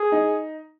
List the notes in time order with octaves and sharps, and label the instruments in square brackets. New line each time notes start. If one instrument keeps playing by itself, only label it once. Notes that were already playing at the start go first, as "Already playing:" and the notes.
Already playing: [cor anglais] G#4
[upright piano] D#4